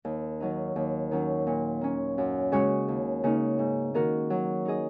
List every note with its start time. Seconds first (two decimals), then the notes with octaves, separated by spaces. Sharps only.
0.05 D#2
0.40 D#3 F#3 D#4
0.76 D#2
1.11 D#3 F#3 C#4
1.47 A#2
1.81 A#3 C#4
2.18 F#2
2.52 C#3 G#3 F#4 C#5
2.88 D#2
3.24 C#3 A#3 D#4
3.59 G#2
3.94 D#3 A#3 F#4 A#4
4.30 F#3
4.65 D#4 G#4 D#5